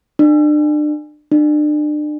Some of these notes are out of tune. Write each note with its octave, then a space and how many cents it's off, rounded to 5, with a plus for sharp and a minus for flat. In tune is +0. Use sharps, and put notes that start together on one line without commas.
D4 +35
D4 +35